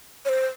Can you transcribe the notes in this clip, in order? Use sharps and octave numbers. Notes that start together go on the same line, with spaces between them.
C#5
C5